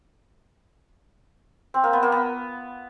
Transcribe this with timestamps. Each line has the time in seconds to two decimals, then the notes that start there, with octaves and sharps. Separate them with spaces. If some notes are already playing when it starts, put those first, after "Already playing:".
1.74 C4
1.84 A#3
1.93 B3
2.03 A#3
2.12 B3